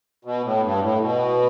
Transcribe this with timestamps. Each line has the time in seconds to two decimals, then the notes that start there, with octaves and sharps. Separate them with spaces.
0.25 B2
0.44 A2
0.63 G2
0.82 A2
1.01 B2